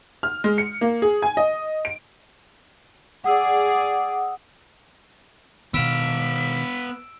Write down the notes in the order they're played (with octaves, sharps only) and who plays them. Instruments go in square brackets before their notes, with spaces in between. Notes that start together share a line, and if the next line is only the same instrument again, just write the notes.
[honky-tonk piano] F6
G#3
C#7
A#3
G#4
G#5
D#5
D7
[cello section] G#4 D5 [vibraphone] F#5 D#6 E6
[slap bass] B2 D#3 [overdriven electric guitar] B3 F5 [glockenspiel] E6 D7 E7 [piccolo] B6